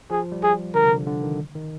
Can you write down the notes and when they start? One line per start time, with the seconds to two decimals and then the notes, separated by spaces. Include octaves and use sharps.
0.11 F3 G#4
0.32 G3
0.43 G#4
0.75 D3 A#4
0.84 C3
0.91 D3
1.07 D3
1.23 D#3
1.55 D#3